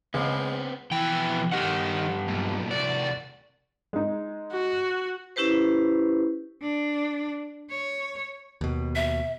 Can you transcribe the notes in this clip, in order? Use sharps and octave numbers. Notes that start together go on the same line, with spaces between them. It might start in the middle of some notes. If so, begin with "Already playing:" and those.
C#2 G#3 B3 C4
F2 B2 E3 G5
G2 D#3 G4 F#5
B1 A#2
C2 F#4 D5
G#3 D#4
F#4
C#4 E4 G4 B4 C5
D4
C#5
D#2 B2
E5